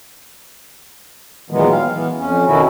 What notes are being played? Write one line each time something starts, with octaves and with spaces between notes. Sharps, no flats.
A#2 D#3 E3 F#3 G#3 B3
F5
E3 B3
F2 C#4
B2 D#3 C#4 E4 F#4